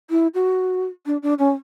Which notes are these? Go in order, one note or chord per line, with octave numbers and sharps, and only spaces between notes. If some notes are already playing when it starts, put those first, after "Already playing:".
E4
F#4
D4
D4
C#4